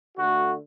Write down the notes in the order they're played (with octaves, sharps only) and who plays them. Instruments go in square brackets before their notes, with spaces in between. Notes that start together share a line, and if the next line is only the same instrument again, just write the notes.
[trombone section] D3 A3 F#4